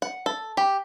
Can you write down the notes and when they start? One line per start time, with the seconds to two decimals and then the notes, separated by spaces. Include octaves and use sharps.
0.02 F#5
0.26 A4
0.57 G4